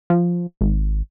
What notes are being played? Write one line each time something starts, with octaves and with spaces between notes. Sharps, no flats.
F3
G#1